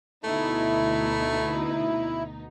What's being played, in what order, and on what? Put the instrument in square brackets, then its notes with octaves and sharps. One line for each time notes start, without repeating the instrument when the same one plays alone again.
[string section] D2 B2 D#4 [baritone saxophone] A3 [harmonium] E4